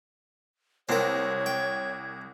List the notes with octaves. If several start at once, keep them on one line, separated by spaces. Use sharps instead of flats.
C2 C4 A#4 C#5 G#6
G5